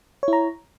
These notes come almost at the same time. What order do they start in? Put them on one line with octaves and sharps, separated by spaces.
C#5 E4 A#5